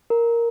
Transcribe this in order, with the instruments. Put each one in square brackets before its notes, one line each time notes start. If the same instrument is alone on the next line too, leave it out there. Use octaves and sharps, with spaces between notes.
[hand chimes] A#4